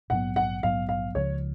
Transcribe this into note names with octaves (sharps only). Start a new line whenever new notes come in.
A#1 G#2 F#3 B3 F#5
F#5
A#1 G#2 F#3 B3 F5
F5
C#2 C#3 F3 G#3 C#5